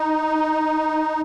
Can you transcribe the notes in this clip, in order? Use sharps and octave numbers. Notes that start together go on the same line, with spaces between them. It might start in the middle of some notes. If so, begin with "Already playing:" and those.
Already playing: D#4